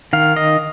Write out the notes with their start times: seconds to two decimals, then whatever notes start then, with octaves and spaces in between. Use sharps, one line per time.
0.13 D#3 F5
0.36 D#5